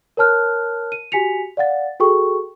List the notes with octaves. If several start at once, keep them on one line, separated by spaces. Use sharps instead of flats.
A#4 C#5 A5 F6 F#6
D#7
F#4 G4 G#5 B6 C#7 F7
D5 F5 F#5 A6
F#4 G#4 A4 G5 C#6